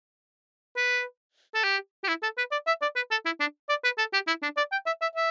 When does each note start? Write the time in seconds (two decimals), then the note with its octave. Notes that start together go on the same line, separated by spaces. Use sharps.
0.77 B4
1.55 A4
1.64 G4
2.04 G4
2.08 E4
2.23 A4
2.38 B4
2.52 D5
2.67 E5
2.82 D5
2.96 B4
3.11 A4
3.25 E4
3.40 D4
3.69 D5
3.84 B4
3.98 A4
4.13 G4
4.28 E4
4.43 D4
4.57 D5
4.72 G5
4.86 E5
5.02 E5
5.16 E5